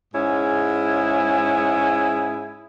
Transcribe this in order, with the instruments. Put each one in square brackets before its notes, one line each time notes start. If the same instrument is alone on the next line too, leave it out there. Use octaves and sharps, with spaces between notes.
[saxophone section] G#2 C#4 E4 G#4